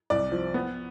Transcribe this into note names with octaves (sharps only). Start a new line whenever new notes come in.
C2 D5
F3
B3